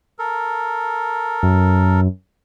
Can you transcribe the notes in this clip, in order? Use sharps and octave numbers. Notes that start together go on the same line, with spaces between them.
A4 A#4
F#2